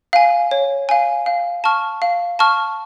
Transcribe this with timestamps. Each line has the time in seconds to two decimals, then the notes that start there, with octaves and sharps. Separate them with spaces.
0.13 F5 G#5
0.51 C#5
0.89 F5 G#5
1.26 F5
1.64 A5 C#6 F6
2.02 F5
2.39 A5 C#6 F6